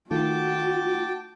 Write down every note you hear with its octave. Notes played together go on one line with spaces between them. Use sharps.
D#3 A3 F4 F#4 G5 A5 D6